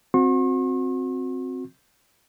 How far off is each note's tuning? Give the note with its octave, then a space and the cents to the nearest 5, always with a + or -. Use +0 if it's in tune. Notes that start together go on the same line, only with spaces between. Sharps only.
C4 +0 F#4 -30 C#6 -45